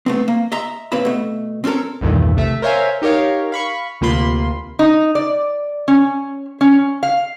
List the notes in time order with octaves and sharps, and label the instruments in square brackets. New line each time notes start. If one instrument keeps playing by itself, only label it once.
[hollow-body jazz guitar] A3 B3 C4
A#3
D#5 E5 A#5 C6
A#2 C4 B4 C#5 E5 B5
B2 A3
C4 C#4 F4 A4 A#4
[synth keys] B1 E2 G2 A#2 D#3 A3
C3 A3 E5
A#4 C5 C#5 E5 F5 G#5
D#4 G4 A#4 C#5 F5
F5 B5 C#6
D2 C3 A#3 F4 B5 C6
[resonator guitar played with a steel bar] D#4
D5
C#4
C#4
F5